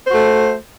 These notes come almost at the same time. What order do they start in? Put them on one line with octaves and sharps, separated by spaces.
C5 F#4 A3